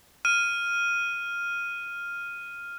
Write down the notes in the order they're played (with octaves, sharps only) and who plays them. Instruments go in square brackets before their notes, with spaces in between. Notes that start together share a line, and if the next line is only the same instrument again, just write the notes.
[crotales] F6 D#7